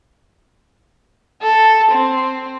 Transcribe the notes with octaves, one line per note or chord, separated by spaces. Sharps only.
A4
C4